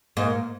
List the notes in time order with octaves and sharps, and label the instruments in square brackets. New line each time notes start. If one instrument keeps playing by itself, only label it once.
[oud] G#2 [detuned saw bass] A#3